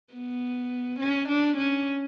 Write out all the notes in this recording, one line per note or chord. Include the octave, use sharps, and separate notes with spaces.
B3
C#4
D4
C#4